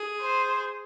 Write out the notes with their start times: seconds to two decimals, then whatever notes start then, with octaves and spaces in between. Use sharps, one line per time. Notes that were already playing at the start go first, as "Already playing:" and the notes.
Already playing: G#4
0.21 C5